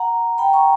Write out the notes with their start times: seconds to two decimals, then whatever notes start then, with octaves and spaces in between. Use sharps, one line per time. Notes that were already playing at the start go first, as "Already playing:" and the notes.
Already playing: F#5 A#5
0.38 G5 B5
0.53 A#5 C#6